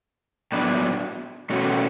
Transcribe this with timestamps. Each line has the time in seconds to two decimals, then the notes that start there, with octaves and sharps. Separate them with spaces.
0.52 A2 F#3 B3 D4
1.50 B2 A3 C#4 F#4